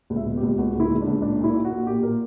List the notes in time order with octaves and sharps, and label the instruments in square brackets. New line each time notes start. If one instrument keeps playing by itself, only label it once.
[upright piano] C#2
E5
B2
G4
C#2
C#2 F#4
C#2
E4
C#2
D4
C#2
A#2 D4
A#2
E4
A#2
F#4
A#1
A#2 G4
A#2 A#4